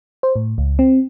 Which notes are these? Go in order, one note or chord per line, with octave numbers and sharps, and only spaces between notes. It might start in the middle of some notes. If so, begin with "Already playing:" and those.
C5
A2
C#2
C4